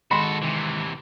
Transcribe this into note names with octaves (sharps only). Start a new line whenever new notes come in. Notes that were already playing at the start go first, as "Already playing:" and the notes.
D#3 G#3 F#4 A4 D#5 B5 C6
C3 E3